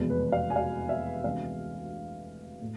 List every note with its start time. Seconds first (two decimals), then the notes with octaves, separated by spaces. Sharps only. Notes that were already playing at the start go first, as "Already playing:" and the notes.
Already playing: F1 E2 B2 G#3 B3
0.10 B4
0.32 F5
0.50 G#5
0.56 F5
0.89 E5
1.24 D2 C3 E3 G#3 B3 F5
2.62 A2